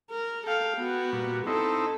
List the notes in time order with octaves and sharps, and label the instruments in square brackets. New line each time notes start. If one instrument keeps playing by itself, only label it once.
[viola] A#4
[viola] A4 F5 [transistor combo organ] G5
[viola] B3 F#4
[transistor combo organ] A#2 G3
[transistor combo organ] C4 D#4 E4 [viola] A4